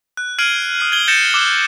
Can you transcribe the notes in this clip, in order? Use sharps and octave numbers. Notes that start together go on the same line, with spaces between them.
F#6
F6 G#6 C7 D7 D#7 F#7
D#6 C7
G#6 F#7 G7
G6 A6 A#6 C#7 D#7 E7
D6 E6 F#6